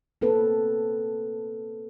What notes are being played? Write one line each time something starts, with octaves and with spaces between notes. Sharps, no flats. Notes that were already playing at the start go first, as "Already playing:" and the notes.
A#3 C4 A4 B4